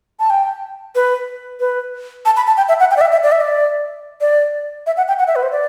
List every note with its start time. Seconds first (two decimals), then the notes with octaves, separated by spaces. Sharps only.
0.20 A5
0.30 G5
0.95 B4
1.60 B4
2.26 A5
2.37 B5
2.47 A5
2.57 G5
2.69 E5
2.80 F#5
2.91 G5
2.97 D5
3.01 E5
3.12 E5
3.23 D5
3.32 E5
3.41 D5
4.21 D5
4.86 E5
4.97 F#5
5.08 G5
5.19 F#5
5.27 E5
5.36 B4
5.43 C5
5.52 D5